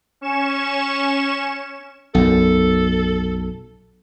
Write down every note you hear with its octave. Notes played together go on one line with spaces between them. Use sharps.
C#4 C#6 E7
B1 F#2 A4